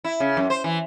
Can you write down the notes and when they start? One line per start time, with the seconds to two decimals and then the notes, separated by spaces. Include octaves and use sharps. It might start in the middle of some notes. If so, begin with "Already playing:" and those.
0.05 E4
0.20 C#3
0.37 F#2
0.50 C5
0.64 E3